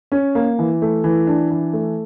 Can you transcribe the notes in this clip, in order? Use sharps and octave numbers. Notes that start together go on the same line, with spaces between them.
C#4
A#3
E3
A3
E3
D4
E3
A3